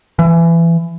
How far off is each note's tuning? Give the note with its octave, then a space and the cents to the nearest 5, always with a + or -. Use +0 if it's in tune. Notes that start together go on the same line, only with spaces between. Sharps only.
E3 +25